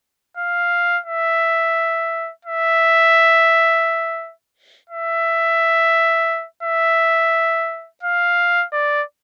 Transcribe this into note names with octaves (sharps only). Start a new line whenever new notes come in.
F5
E5
E5
E5
E5
F5
D5